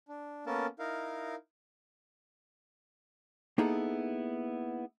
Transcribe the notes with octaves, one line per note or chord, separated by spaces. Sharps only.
D4
A#3 B3 C#4 A4 A#4 A5
D#4 E4 A#4 F5
A#3 B3 D#4 E4 G#4 A4